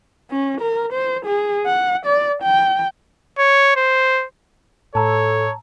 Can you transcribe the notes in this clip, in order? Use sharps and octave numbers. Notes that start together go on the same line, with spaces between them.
C#4
A#4
C5
G#4
F#5
D5
G5
C#5
C5
A2 A4 C#5 A5 A#5 E6